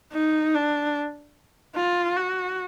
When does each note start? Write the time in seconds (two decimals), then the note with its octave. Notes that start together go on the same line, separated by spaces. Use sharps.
0.13 D#4
0.54 D4
1.75 F4
2.16 F#4